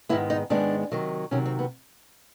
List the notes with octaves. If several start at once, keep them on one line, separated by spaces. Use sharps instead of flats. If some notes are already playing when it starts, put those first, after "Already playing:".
G#2 D#3 G#3 B3 E4
D#4
G#2 D#3 G#3 B3 D4
C3 D#3 F#3
C3 D#3 F#3 C#4
C4
B3